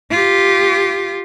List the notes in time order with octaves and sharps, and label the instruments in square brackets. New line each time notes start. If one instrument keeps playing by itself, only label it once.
[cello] F4 G4